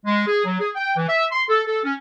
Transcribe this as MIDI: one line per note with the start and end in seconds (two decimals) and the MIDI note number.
0.06 0.22 56
0.27 0.44 68
0.45 0.57 54
0.59 0.69 68
0.75 0.95 79
0.96 1.06 52
1.08 1.25 76
1.31 1.42 84
1.49 1.62 69
1.67 1.79 69
1.84 1.93 61